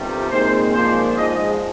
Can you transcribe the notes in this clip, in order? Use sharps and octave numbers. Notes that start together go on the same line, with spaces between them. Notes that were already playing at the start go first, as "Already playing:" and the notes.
Already playing: G1 F2 C3 D#3 G3
A#2 G#3 C4 D#4 C5
A#2 F3 G#3 D4 C5
G#2 F3 G#3 D#5